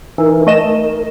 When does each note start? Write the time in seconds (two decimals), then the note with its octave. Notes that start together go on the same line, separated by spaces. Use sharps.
0.18 E3 D#4 A#4
0.47 A3 A#4 D#5 E7